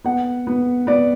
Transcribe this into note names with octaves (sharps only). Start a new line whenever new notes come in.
B3 F#5
B3
B3 D5